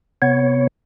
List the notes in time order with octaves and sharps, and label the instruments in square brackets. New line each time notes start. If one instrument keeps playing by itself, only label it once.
[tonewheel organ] C3 B3 C#5